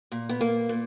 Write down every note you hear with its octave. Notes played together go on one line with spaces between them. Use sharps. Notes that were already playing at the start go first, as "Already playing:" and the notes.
A#2
B3
A#3
A#2